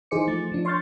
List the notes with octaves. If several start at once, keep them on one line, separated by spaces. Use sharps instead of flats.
E3 D#4 G#4 C5 D6 C#7
F3 A3 A6
F3 D4
C#5 C6 C#6 F6 G6 A6